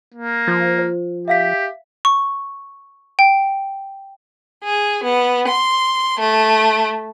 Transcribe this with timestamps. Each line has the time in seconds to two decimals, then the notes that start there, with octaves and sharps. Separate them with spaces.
0.14 A#3
0.47 F3
0.78 C5
1.28 G4 E5 F5 B6
2.05 C#6
3.19 G5
4.64 G#4
5.05 B3
5.46 C6
6.19 A3